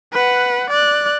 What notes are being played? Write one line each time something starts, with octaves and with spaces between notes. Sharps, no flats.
B4 F#5
D5 F#6